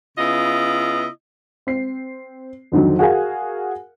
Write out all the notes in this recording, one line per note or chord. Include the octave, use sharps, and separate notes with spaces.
C#3 B3 E4 F4 D#5
C4 C7
F2 D3 D#3 F#3
F#4 G#4 A#4 F5 G#5